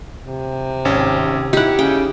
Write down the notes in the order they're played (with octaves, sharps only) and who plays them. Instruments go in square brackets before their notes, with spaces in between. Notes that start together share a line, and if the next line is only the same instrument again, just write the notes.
[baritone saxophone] C3
[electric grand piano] G#1 C#4
[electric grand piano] D#4 E4 [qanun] G4 F#5
[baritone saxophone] C#3 [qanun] G5